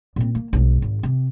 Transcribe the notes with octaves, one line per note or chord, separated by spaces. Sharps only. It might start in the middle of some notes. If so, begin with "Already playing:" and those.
A#2 C4
A#3
B1 G#3
G#1
C3